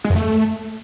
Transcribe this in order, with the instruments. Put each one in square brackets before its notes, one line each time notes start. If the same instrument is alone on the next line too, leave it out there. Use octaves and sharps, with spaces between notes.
[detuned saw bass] G#3
F#2
A3